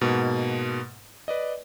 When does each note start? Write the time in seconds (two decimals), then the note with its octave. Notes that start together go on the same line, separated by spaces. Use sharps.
0.01 G#2 B2 A#3
1.28 B4 D5 D#5